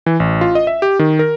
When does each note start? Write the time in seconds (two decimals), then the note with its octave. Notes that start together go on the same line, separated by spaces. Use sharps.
0.06 E3
0.20 A1
0.41 F4
0.55 D#5
0.67 E5
0.82 G4
0.99 D#3
1.19 A#4